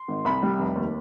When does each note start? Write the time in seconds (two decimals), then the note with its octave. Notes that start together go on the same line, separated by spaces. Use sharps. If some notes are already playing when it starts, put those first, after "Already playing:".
Already playing: C6
0.08 G#1
0.25 C2 B5
0.43 G3
0.59 F1
0.75 D#2